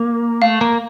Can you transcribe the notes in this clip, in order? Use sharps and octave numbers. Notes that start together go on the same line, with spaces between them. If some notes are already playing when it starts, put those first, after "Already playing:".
Already playing: A#3
A3 F5
A#3